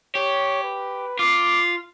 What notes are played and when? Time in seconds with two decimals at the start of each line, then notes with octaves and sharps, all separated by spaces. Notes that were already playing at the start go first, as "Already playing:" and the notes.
0.15 G4 C#5
0.63 B4
1.19 F4 D6